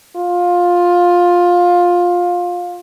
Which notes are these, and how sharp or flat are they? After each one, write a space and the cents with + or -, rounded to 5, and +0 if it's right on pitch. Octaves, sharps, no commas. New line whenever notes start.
F4 +15